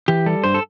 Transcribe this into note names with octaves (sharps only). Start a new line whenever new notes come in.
E3 G4
G3 A4
G2 C5
A4